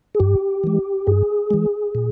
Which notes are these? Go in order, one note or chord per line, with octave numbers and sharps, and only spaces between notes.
G#4
G2 G4
E3 G#3
G2 G#4
E3 G#3
A#2